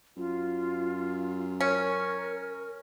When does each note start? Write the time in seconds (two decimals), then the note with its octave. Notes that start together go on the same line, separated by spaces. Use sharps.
0.17 F#2 F4
1.60 C#4 A#4